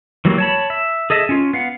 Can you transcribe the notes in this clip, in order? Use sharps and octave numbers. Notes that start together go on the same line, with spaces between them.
E3 F#3 G3 A#3
C#5 A5 B5
E5
G#4 A4 D#5 E5
C#4 F4
B3 F5 F#5